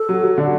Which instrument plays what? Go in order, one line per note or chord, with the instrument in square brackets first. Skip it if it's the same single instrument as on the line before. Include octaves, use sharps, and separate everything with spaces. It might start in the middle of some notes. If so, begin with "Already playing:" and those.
Already playing: [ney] A4
[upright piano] F#3
F#3
D3